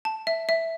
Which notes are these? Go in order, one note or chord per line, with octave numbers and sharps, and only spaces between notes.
A5
E5
E5